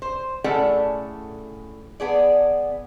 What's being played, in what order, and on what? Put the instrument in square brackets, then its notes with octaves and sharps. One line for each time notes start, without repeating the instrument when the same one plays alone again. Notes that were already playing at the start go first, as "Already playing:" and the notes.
[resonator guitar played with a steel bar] C5
A2 C#4 G#4 A4 D5 F#5
B3 G#4 D5